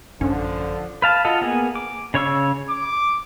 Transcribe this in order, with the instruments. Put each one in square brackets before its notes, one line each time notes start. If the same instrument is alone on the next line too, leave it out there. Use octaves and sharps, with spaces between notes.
[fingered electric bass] A1 F#2 D4 [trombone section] D3 F3 [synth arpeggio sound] C#4
[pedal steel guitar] B4 F5 A5
F4 F#4 A4 D#5
A#3 B3 G#4
D6
C#3 C#5 C#6 E6
[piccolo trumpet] D6